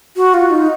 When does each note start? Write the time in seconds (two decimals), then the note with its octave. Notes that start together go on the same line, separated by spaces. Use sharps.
0.16 F#4
0.34 F4
0.51 D#4